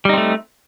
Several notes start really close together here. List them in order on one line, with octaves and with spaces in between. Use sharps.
G3 D#4 C4 A3